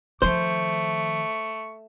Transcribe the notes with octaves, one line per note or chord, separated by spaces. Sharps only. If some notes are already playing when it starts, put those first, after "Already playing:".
D#3 F3 A3 C5 C#6